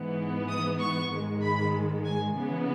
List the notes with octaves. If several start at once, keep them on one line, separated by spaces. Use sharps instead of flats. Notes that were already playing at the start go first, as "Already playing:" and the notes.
Already playing: G#2 E3 B3
D#6
C#6
G#2 D#3 G#3
B5
G#5
C#3 E3 B3